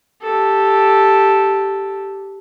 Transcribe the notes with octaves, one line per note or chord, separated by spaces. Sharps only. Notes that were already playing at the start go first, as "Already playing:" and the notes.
G4 A4